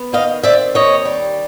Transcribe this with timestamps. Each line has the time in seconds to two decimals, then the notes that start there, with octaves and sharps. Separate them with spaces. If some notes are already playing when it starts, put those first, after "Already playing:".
Already playing: B3
0.13 D#3 D#5 F5
0.43 C4 D5 E5
0.75 D#2 C#5 D#5
1.05 G3